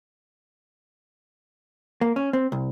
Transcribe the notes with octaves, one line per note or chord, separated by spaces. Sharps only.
A#3
C#4
C4
C2